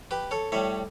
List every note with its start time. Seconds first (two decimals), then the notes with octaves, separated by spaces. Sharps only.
0.11 G4 B4
0.31 A4 C#5
0.52 A2 G3 C#5 E5